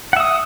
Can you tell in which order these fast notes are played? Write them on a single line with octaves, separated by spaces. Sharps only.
F#5 E5 D#6